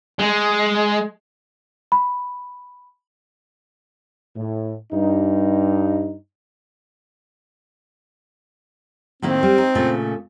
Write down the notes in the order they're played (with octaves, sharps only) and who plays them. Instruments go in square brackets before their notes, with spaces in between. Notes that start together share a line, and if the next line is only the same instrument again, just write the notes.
[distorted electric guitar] G#3
[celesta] B5
[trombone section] A2
G2 D#4
[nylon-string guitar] A2 D#3 A#3 [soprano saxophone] C4
[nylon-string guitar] G3
D#4
A#2 C#3 A3